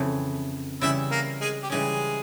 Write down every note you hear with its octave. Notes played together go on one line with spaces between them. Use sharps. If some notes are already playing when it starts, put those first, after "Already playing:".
Already playing: F2 C#3 E3
C#3 E3 G3 C#4 E4 E5
A#3 A#4
G#3 G#4
G4
C#3 E3 G3 G#3 C#4 G#4